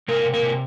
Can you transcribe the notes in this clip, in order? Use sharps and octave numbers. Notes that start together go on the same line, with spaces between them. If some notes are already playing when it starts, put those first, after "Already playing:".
C3 A#3 A#4
C3
A#3 A#4
C3